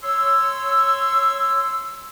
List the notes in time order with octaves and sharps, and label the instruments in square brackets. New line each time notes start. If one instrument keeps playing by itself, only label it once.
[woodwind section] C#5 C6 E6